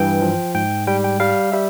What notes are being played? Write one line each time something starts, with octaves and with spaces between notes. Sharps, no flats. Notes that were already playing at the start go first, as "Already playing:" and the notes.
Already playing: G2 E3 G5
F3
G#2 G5
G3 G5
G5
G3 F5
G3 E5